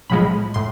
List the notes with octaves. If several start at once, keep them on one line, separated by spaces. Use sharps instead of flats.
B1 A2 F3 G#3 B5
A2 C6